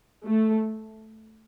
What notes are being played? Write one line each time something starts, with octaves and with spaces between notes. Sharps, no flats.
A3